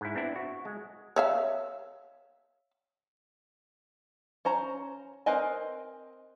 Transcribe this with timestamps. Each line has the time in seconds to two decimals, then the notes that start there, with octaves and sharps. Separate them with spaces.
0.01 G#2 E4
0.15 B3 C4 D4 E4
0.36 F#4
0.65 G#3
1.16 C#5 E5 F5
4.45 C#4 C5 A#5
5.26 C4 A#4 B4 D#5 G#5